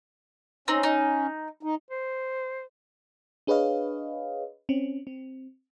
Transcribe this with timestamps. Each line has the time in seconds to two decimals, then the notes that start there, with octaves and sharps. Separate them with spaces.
0.68 C4 C#4 D#4
0.83 D#4
1.63 D#4
1.91 C5
3.47 D4 G#4 B4 C#5 D#5 F5
4.69 C4 C#4
5.07 C4